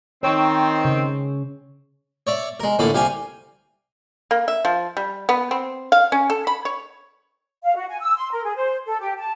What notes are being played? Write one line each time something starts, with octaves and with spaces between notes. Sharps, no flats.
D#3 C4 C#5
C#3
C#5 D5 E5
G#3 A#4
A2 D3 A#3 D5 D6
C2 G4 F5 G#5
A#3
E5
F3
G3
B3
C4
F5
C#4
A4
B5
C#5
F5
F#4
G#5
E6
C6
A#4
G#4
C5
A4
G4
A5